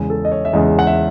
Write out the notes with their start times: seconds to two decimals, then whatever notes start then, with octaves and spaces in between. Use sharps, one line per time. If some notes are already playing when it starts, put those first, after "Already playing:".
Already playing: E2 C#3 G#3 G#4
0.10 A4
0.25 D#5
0.32 C#5
0.45 E5
0.53 E2 C#3 G#3 D#5
0.79 F#5
0.87 E5